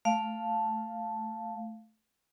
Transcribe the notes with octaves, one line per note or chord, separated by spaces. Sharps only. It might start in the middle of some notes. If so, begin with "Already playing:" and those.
A3 F5 A5